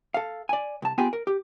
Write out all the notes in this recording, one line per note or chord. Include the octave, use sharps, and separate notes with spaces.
A4 F5
D5 G#5
C2 A5
B3 F4 G4 G#4 G5 G#5
A#4
G4